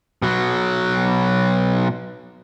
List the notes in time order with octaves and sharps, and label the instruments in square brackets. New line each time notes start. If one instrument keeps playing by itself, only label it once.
[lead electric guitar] B2 F#3